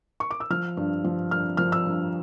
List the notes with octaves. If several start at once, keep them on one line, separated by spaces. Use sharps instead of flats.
C#6
D6
E6
F3 F6
G2
F3
G2 F6
F3 F6
E6
G2